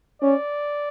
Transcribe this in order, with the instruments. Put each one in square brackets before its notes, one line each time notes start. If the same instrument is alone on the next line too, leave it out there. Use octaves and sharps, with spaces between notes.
[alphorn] C#4 [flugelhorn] D5